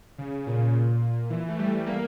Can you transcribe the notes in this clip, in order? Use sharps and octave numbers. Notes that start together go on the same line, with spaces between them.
C#3
A#2
A#2
E3
A3
G3
A#3